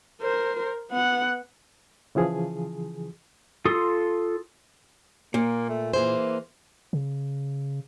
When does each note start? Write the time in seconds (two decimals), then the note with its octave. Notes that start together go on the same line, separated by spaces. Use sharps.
0.21 A#4 C5
0.90 B3 F#5
2.15 C#3 E3 F3 G#4
3.65 F4 A4 C6 D#6
5.34 A#2 A#3
5.69 A3
5.94 E3 A#3 G#4 C5
6.93 C#3